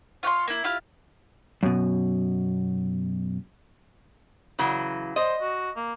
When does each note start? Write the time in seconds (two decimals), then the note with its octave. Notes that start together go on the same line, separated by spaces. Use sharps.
0.23 F4 C#5 F#5 C6
0.48 A#3 E4
0.64 E4 F4 G4
1.63 F#2 B2
4.59 C#3 E3 F#3
5.16 C5 D#5
5.41 F#4
5.76 A#3